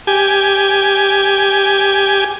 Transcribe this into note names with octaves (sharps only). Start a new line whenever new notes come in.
G4 G#5